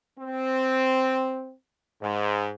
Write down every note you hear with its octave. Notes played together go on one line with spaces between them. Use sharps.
C4
G#2